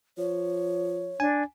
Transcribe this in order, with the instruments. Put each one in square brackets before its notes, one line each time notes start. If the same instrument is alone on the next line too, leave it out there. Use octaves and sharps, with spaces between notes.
[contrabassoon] F3 [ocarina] C#5
[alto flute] D4 [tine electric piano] G#5